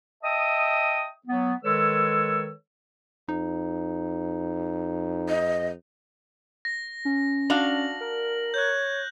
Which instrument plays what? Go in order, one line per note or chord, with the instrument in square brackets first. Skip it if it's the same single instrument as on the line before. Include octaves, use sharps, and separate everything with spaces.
[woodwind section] D#5 E5 G5 A5 D#6
F#3 B3
D#3 G#3 A4 B4 C#5 E6
[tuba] F2 [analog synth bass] D#4
[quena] D#5
[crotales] A#6
[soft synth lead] C#4
[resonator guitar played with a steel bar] D4 F#4 F5 [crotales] F#7
[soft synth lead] A#4
[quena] C#5 [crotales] F#6 G6